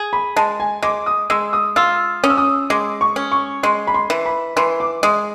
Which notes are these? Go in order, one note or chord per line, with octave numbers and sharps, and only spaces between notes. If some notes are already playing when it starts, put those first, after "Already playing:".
Already playing: G#4
B5
G#3 A5
G#5
G#3 D6
D#6
G#3 E6
D#6
F4 E6
C#4 D#6
E6
D#6
G#3 D6
C#6
C#4
C#6
G#3 C6
B5
C6
E3
B5
E3 C6
D6
G#3 D#6